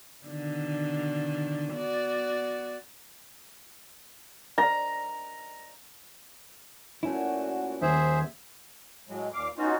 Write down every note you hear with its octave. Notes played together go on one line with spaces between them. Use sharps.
B2 D3 D#3
B3 F#4 D5
A#5
A#2 A3 C#4 E4 F#4
D#1 G#4 C5 E5
A2 F#3 G#3
D#2 A#2 F5 D6
B3 C#4 D#4 F4 F#4